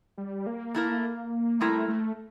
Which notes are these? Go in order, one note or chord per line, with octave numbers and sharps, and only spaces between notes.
G3
A#3
A3 E4 A#4
G3 A3 C4 E4 A#4
A3